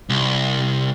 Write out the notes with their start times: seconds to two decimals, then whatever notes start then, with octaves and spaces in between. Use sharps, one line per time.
0.10 C2